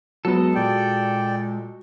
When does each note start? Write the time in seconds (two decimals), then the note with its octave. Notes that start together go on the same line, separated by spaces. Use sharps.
0.25 F#3 G#3 B3 A4
0.55 A#2 F#4 D5 G5